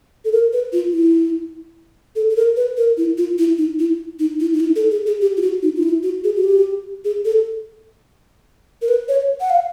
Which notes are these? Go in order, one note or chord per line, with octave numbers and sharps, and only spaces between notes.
A4
A#4
B4
F4
E4
A4
A4
A#4
B4
A#4
E4
F4
E4
D#4
E4
D#4
E4
D#4
E4
A4
G#4
G#4
G4
F4
F#4
D#4
F4
E4
F#4
G#4
F#4
G4
G#4
A4
A#4
B4
C#5
F#5
F5